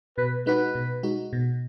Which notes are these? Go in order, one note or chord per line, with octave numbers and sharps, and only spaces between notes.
B2 B4
G#3 D#4 F#4 B4
B2
G#3 D#4 F#4
B2